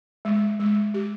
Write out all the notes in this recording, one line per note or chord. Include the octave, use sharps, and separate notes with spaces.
G#3
G#3
G4